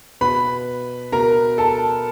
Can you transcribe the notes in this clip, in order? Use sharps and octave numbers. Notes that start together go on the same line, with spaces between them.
B2 B4 B5
B2 A#4 A#5
A4 A5